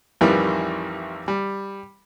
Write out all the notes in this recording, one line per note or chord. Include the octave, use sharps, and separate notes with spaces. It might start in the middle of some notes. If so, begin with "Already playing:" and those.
A1 F2 D#3 E3 G3
G3